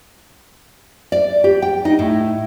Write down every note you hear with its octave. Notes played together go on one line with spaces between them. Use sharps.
D5
G4
G5
D#4
A2